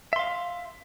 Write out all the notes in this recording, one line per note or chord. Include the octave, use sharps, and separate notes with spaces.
E5 F5 C6